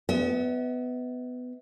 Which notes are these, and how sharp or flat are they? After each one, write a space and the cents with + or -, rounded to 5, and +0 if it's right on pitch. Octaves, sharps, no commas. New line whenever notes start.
B3 +15 E5 -40